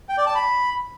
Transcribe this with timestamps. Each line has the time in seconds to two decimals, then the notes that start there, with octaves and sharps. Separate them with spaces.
0.09 G5
0.18 D5
0.26 A5
0.35 B5